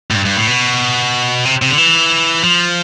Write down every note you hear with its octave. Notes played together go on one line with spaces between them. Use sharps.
A2
G2
G2
A2
B2
C3
C3
D3
E3
F3